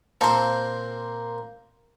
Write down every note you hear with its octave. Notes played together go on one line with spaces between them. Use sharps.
A#2 A#3 C4 A4 C5